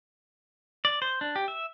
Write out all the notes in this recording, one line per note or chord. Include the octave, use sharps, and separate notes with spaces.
D5
C5
D4
G4
E5